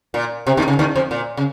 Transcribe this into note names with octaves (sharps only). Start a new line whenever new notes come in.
A#2
C3
D#2 D#3
C#3
D#2 D#3
F2 F3
A#2
C#3